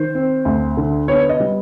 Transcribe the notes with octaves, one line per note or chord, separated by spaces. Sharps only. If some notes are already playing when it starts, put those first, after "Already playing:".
Already playing: D#3 C5
C4
D2
D3
B3 C#5
D#5
G3